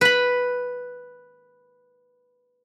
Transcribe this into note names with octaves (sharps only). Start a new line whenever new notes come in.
B4 B5